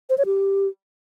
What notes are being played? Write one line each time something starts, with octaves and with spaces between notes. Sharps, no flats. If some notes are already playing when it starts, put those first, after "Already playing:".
C5
C#5
G4